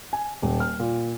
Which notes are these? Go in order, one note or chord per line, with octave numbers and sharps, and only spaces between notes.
G#5
D#1
F6
A#2